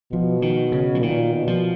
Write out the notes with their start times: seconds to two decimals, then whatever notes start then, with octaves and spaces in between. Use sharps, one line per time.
0.12 B2 F3
0.42 D#3
0.72 C#3
0.95 F3
1.02 A#2 D#3
1.33 B2
1.47 F3